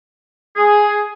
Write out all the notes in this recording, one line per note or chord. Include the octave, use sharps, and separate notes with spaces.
G#4